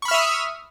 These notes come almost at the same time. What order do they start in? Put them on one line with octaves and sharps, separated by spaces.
C#6 B5 F6 E5 D#6